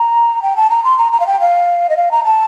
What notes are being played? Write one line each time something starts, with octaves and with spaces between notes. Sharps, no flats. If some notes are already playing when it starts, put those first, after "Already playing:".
Already playing: A#5
G5
A5
A#5
C6
A#5
A#5
F5
G5
F5
D#5
F5
A#5
A5